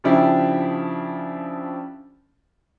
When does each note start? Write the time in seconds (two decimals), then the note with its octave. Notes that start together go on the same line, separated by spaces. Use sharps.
0.04 C#3 F3 D4 E4 G4